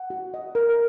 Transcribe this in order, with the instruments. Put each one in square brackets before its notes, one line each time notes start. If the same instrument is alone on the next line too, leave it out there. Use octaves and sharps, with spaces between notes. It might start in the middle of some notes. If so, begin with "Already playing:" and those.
Already playing: [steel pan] F#5
F#4
D#5
A#4